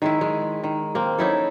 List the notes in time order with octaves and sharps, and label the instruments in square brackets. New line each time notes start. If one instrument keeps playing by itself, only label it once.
[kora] D#3 G#3 E4
G#3
D#3
A#3 C4
C#4 D#4 E4 A4